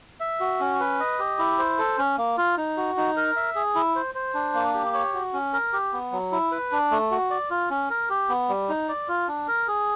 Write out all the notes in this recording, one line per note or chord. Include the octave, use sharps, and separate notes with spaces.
E5
F#4
C#4
B4
D#5
G4
E4
C5
A4
C#4
A#3
F4
D#4
F#4
D#4
A#4
E5
G#4
E4
C5
C5
D4
A#3
G4
C#5
F#4
C#4
A#4
G4
B3
F#3
E4
B4
D4
A3
F#4
D5
F4
C#4
A#4
G4
B3
G3
D#4
D5
F4
D4
A#4
G#4